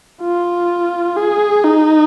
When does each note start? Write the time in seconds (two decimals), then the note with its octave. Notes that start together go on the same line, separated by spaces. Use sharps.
0.22 F4
1.17 G#4
1.64 D#4